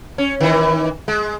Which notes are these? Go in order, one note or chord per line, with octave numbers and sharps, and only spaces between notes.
C#4
D#3 E3
G#3